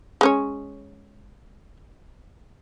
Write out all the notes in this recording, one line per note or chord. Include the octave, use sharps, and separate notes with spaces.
G#3 C#4 C#5